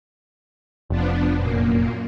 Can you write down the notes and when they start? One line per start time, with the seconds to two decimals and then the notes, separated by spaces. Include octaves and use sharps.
0.90 F1 F3 B3 D4
1.36 F#2 A#2 A#3